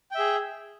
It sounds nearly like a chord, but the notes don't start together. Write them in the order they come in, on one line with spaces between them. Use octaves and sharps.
G5 E5 G#4